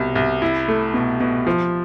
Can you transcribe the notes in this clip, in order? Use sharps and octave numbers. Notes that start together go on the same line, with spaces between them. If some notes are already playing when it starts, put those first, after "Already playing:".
Already playing: C2 B2
C2
E4
A3
B2
B2
F3